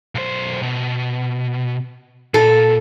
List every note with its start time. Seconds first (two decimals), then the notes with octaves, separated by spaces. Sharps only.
0.15 B1 C5
0.63 B2
2.34 A#2 A4